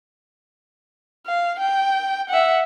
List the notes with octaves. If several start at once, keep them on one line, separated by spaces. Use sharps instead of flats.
F5
G5
E5 F#5